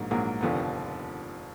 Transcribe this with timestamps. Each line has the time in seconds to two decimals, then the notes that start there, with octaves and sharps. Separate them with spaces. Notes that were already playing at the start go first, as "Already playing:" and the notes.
Already playing: A#1 G#2 F#3 A#3
0.11 A#1 G#2 F#3 A#3
0.41 F1 D#2 D3 F3 B3